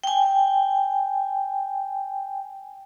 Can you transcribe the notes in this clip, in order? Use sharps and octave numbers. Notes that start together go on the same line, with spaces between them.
G5 G#5